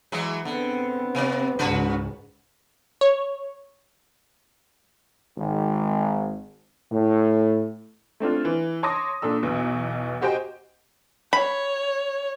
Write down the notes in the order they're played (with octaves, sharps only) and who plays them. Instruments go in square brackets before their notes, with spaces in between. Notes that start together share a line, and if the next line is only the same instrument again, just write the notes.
[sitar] E3 F#3 G#3
[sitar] D3 [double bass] B3 C4
[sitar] C3 D5
[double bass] C#2 G#2 [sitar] C#3 F#4 B4
[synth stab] C#5
[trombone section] G#1
A2
[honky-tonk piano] A3 C4 D4 F4
E3
C#5 A5 C6 D6 D#6 A#6
A#2 D4 A4 E6
B1 E2 B2
F#4 G4 C5 D#5 G5 G#5
[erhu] C#5 [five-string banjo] B5